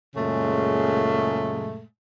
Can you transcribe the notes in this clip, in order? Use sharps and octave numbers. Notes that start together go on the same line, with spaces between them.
F#2 A#2 C#3 G#3 A3